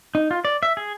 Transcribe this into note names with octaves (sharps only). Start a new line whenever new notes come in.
D#4
F4
D5
E5
G#4